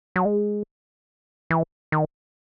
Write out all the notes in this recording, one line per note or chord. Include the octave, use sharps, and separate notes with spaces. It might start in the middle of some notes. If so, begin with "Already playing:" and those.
F#3
G#3
E3
D#3